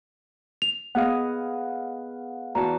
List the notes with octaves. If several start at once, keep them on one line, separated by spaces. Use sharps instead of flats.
F7
B3 G#4 D#5 F5 F#5
E2 F#4 A5 A#5